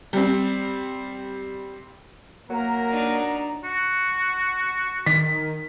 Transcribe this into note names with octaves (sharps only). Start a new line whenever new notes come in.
G3 C4
F#3 A#3 A#4 A#5
D4 D#4
F#4
D#3 B6